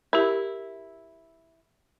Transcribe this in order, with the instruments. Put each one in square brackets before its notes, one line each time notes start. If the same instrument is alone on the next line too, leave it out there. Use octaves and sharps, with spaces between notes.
[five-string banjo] E4 [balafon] G4 A#4